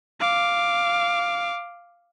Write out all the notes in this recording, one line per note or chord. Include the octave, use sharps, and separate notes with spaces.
F5 D6